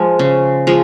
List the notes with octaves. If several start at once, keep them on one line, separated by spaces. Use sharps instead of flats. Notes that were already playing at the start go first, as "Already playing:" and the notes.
Already playing: F3 G#3
C#3
F3 G#3